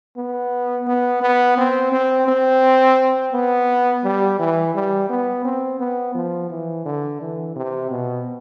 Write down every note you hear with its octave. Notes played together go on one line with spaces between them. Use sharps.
B3
B3
B3
C4
C4
C4
B3
G3
E3
G3
B3
C4
B3
F3
E3
D3
E3
C3
B2